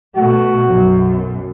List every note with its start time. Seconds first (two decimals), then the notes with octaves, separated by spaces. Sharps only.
0.15 B2 A3 F#4
0.66 B1 F#2